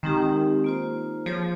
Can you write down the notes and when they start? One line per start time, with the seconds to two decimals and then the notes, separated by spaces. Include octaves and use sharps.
0.03 D#3 G#3 C4 D#4 G4
0.64 A#3 F4 C5
1.26 F3 F4 G#4 C#5